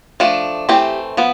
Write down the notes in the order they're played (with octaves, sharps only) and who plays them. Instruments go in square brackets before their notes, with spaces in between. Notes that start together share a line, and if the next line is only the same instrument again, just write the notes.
[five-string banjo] F3 A3 D4
E3 A3 C4 G4
F3 B3